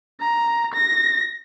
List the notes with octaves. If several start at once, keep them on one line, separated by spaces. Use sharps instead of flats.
A#5
A#6